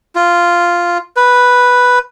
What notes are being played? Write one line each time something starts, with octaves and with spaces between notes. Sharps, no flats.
F4
B4